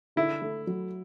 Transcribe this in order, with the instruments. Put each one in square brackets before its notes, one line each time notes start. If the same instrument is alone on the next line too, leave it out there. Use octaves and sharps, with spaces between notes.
[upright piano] D3 [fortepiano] E4
[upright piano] A3
F#3